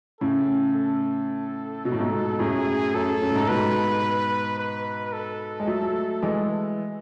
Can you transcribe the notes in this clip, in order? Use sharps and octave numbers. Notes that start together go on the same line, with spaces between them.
A2 C#3 A4
A4
B2
A2
G#2 B2
F#2 A2 G#4
F#2 A4
F#2
A2
G#2
G#2 B2 B4
B4
A4
G#3
F#3 A3
E3 G#3